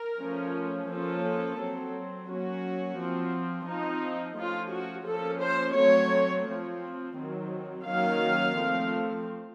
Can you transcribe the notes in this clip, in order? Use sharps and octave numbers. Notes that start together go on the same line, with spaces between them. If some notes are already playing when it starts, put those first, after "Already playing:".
Already playing: A#4
F3 A3 C#4
F3 A#3 C#4 A4
F#3 C4
F#3 A#3 C#4 F#4
F3 C4
F3 C4 D#4
F3 A3 C#4 F4
F#4
F3 A#3 C#4 A4
C5
F#3 A3 C4 C#5
F3 C4
D#3 F#3 C4
D#3 F#3 A#3 C#4 F5
F3 A3 C4